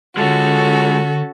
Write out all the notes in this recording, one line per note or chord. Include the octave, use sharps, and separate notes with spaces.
D3 G#3 C#4 F4 F#4 A4